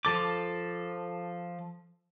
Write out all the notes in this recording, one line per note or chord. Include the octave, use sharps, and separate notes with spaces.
F3 A4 D6